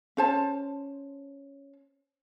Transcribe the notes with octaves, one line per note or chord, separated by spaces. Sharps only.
C#4 C5 A5